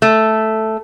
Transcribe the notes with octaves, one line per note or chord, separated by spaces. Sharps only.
A3